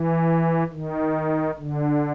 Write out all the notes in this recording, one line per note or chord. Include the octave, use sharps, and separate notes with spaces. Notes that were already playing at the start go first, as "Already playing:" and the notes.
Already playing: E3
D#3
D3